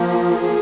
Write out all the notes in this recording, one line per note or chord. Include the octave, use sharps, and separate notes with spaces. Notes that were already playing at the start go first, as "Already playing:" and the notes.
Already playing: F3 A#3
G#4